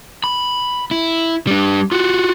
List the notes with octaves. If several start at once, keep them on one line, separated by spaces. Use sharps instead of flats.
B5
E4
G3 D4
F4 F#4